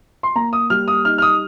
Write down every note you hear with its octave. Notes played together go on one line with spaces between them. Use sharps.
C6
A#3 A#5
D#6
G3 F6
D#6
D#4 F6
F6
D#6